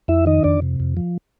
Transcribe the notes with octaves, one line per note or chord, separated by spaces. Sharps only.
F2 E4 E5
D#3 D#4 D#5
F2 D4 D5
C3
F2
F3